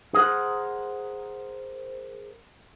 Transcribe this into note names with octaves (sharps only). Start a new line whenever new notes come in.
G#4 A#4 C5 F#5